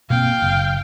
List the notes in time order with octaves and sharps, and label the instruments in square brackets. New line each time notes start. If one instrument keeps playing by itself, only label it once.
[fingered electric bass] B2 A#3 C4 [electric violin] F5 G5
[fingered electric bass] F#1